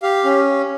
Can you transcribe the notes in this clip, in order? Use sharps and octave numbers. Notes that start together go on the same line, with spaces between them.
G4 F5
C#4